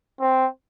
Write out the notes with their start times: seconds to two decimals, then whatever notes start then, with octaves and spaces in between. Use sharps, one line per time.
0.20 C4